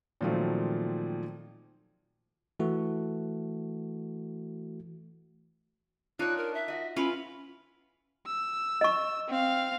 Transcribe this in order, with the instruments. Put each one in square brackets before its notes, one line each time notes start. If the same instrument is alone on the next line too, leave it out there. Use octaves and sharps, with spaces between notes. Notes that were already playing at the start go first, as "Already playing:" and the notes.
[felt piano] A#2 D#3 F3 F#3 A3 C4
[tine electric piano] E3 A3 F#4
[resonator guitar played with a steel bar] D4 C#5 [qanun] D#4 F4 [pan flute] F#6
[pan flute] A#4
E5
[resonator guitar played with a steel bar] F#4 D#5
[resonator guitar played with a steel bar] C#4 E4 [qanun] F4 B4 [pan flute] B5
[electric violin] E6
[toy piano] D#5 C#6
[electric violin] C4 F5